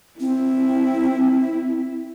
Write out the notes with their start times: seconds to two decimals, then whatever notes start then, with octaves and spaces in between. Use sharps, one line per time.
0.20 C4 E4